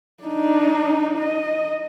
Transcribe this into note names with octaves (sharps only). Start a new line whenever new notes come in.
D4 D#4
D#5